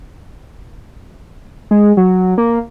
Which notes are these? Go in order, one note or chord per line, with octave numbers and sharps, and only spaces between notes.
G#3
F#3
A#3